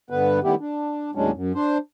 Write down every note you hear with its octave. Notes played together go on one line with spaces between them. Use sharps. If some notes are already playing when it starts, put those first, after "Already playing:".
G2 D3 B3 B4
A2 D#3 G3 B3 E4 G4
D4
D#2 A2 F#3 G#3 C#4 D4
F#2
D4 C5